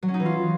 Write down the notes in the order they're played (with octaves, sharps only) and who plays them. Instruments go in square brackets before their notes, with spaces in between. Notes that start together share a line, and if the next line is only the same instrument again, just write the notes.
[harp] F#3
C#4
D#4
E3
F4